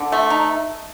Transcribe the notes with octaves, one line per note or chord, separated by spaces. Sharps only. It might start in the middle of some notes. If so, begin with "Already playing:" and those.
Already playing: D3
A3
D#4